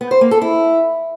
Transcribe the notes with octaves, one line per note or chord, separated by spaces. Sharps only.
B3
C5
A#3
A4
E4